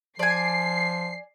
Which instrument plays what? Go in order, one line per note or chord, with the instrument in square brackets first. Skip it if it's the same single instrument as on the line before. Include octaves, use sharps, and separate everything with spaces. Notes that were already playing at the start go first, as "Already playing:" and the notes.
[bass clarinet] F3 [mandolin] D5 G#5 [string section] C7